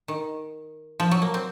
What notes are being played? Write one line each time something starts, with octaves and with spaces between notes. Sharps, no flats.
D#3
F3
F#3
A#3
C4